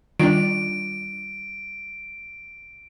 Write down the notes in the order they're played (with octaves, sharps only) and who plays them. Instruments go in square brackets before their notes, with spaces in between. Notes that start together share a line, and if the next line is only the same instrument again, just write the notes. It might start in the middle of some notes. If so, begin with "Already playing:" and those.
[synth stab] D#3 D4 [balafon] G3 F4 [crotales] D7